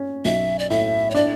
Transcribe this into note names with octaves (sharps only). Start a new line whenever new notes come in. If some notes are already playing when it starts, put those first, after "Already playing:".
Already playing: C#4
B1 E5
D5
A2 E5
C#5
D4 D5